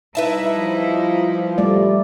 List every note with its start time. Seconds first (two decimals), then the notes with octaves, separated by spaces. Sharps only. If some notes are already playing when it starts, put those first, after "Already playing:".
0.15 G3 D#4 E4 B4 E5 A5
0.58 F3
1.58 G3 A3 D5